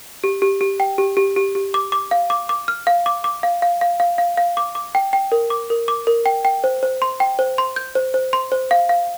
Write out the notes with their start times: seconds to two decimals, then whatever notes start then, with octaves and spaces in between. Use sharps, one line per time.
0.24 G4
0.42 G4
0.61 G4
0.80 G5
0.98 G4
1.17 G4
1.36 G4
1.55 G4
1.74 D6
1.92 D6
2.11 F5
2.30 D6
2.49 D6
2.68 F6
2.87 F5
3.06 D6
3.24 D6
3.43 F5
3.62 F5
3.81 F5
4.00 F5
4.18 F5
4.37 F5
4.57 D6
4.75 D6
4.95 G5
5.13 G5
5.32 A#4
5.50 D6
5.70 A#4
5.88 D6
6.07 A#4
6.26 G5
6.45 G5
6.64 C5
6.83 C5
7.02 C6
7.20 G5
7.39 C5
7.58 C6
7.76 G6
7.95 C5
8.14 C5
8.33 C6
8.52 C5
8.71 F5
8.89 F5